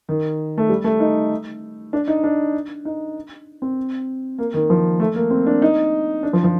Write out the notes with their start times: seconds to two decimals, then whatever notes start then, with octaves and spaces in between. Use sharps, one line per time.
0.09 D#3
0.58 A3
0.69 G3
0.84 A3
1.00 D#4
1.93 D4
2.08 D#4
2.24 D4
2.85 D#4
3.62 C4
4.38 A#3
4.54 D#3
4.70 F3
5.00 A3
5.15 A#3
5.31 C4
5.47 D4
5.62 D#4
6.23 D4
6.33 F3
6.44 F3